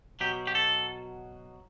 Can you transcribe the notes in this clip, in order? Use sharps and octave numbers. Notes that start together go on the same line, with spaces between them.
B2 F#3 G4
G4
A4